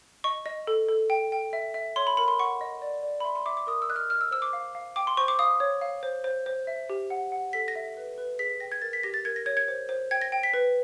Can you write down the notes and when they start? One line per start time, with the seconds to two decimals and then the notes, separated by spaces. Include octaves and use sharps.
0.24 D#5 C#6
0.46 D#5
0.67 A4
0.89 A4
1.10 G5
1.32 G5
1.53 E5
1.74 E5
1.96 C#5 C6
2.07 B5
2.17 A#4 B5
2.28 C6
2.39 F#5 C#6
2.61 D#5
2.82 D5
3.03 D5
3.20 B5
3.24 E5 C6
3.35 C6
3.46 E5 D6
3.57 D6
3.67 A#4 D#6
3.82 E6
3.89 D#5 F#6
3.96 F6
4.10 D#5 F6
4.21 E6
4.31 C5 E6
4.42 D6
4.53 F5
4.75 F5
4.96 G5 D6
5.07 C6
5.17 C5 C#6
5.28 D6
5.39 F5 D#6
5.60 C#5
5.81 F5
6.03 C5
6.24 C5
6.46 C5
6.67 E5
6.90 G4
7.10 F#5
7.32 F#5
7.53 A4 B6
7.68 A#6
7.76 E5
7.97 B4
8.18 B4
8.39 G#4 B6
8.50 B6
8.60 G5 A#6
8.72 G#6
8.82 A#4 A6
8.93 B6
9.03 G4 A#6
9.14 A6
9.25 A#4 G#6
9.36 A#6
9.46 C#5 G#6
9.57 G#6
9.68 C5
9.89 C5
10.11 G5 G#6
10.22 A#6
10.32 G5
10.43 B6
10.54 B4